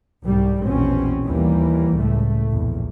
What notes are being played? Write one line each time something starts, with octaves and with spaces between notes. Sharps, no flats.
C2 G#2 G3
A#1 E2 B2 C4 C#4
D#2 E3 G3 A#3
C#2 A2 A3
A#1 E2